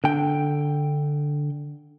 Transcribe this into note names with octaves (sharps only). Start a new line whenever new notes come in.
D3 G5